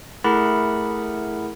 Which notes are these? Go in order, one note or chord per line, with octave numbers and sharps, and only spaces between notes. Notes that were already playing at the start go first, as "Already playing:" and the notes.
A3 E4 G#4 A#4 F#5 B5